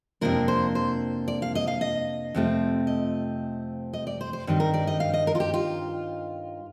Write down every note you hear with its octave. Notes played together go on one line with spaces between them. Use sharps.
F2 C3 F3 A#3 D4 A#4
C5
C5
D5
F5
D#5
F5
D#5
F2 C3 F3 A3 C4
D#5
D#5
D5
C5
C5
G2 D#3 G3 C4 D#4
A#4
D5
D#5
F5
D#5
A#4
F4
G4
F4